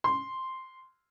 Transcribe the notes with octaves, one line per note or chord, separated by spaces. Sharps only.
C6